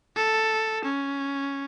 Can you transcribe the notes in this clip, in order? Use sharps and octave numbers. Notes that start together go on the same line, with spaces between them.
A4
C#4